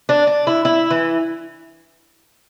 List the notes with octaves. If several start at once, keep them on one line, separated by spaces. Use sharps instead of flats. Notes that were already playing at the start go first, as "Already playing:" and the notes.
D4
D4
E4
E4
E3